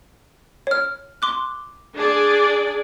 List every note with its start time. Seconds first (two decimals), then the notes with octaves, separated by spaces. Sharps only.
0.67 C#5 F6
1.22 C6 D6 F#6
1.96 D4 G#4 D5